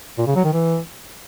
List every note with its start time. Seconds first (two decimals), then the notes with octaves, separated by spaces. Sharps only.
0.18 A#2
0.27 C#3
0.36 F#3
0.44 D#3
0.53 E3